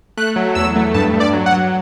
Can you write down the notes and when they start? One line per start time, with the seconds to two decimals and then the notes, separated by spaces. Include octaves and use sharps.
0.17 A3 F#6
0.36 F#3
0.55 E2 E6
0.75 A3
0.94 G2 A5
1.14 G2
1.20 D5
1.33 F#3
1.46 F#5
1.52 F#3